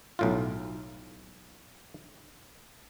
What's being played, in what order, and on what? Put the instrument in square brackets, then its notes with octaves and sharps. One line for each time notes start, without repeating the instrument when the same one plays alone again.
[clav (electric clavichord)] B1 A2 F4